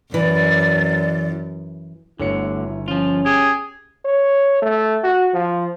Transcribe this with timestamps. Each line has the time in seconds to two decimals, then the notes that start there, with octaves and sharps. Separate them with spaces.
0.14 F#2 E3 D5
2.20 G1 D2 D3 E4 C#5 C#7
2.88 F3 C#4 F4
3.26 G4 G#4
4.05 C#5
4.62 A3
5.04 F#4
5.34 F3